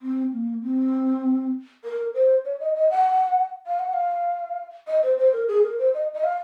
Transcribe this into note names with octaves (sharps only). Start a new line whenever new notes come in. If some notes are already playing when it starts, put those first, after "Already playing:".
C4
A#3
C4
A#4
C5
C#5
D#5
D#5
F#5
F5
F#5
F5
D#5
C5
C5
A#4
G#4
A#4
C5
D#5
D#5
F5